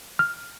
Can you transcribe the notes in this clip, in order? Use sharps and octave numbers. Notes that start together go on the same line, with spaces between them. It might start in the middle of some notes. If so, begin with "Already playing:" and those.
F6